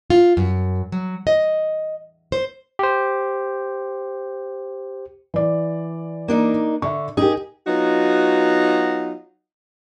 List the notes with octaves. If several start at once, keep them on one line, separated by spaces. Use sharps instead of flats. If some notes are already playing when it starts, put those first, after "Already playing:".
F4
F#2
F#3
D#5
C5
G4 C5
E3 D5
A#3 D4 D#4
D3 E5 C#6
D#4 G4 G#4 A#4
F#3 B3 D#4 F4 F#4